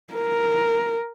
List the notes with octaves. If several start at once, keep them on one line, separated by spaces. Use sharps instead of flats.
A#4